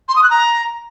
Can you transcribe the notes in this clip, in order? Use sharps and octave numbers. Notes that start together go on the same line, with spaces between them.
C6
D#6
F#6
A#5